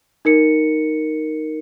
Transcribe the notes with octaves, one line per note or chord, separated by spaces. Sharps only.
D#4 A#4 C#7